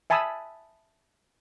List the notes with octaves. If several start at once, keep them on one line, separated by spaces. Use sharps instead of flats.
E5 G#5 A5 B5 D#6 E6